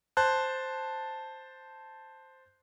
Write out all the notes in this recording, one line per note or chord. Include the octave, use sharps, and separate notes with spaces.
C5 A5 F#6